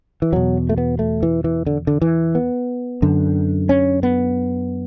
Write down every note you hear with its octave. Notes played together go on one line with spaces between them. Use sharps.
E3
E2 B2 F#3
A3
B3
A3
E3
E3
D3
D3
E3
B3
F#2 D3
C#4
B3